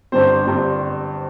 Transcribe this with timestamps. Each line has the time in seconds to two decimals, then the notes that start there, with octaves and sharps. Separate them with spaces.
0.12 G1 G2 G3 C4 C5
0.46 G1 G2 G3 C4